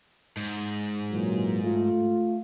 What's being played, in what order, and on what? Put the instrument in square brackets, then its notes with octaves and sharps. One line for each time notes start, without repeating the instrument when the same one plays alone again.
[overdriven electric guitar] G#2
[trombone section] A#2 E3 F#3
A3 F4